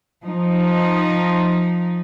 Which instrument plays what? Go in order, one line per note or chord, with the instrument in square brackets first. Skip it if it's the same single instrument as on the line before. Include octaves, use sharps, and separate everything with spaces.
[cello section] F3 D#4